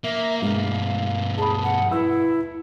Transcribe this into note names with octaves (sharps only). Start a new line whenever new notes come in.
A#3 E5
G2 B2 G#3 F5
G#4 A5 B5
F#5
E4 B4 E6